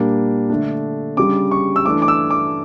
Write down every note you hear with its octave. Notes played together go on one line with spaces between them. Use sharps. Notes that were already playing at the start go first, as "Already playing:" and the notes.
Already playing: A#2 G3 A#3 D4
D3 A3 D4
C#3 G3 D4 D6
C#6
E6
E3 A3 D4 D6
D6
E6
D6